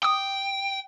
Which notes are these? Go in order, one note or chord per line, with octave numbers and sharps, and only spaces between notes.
G5 D6 D#6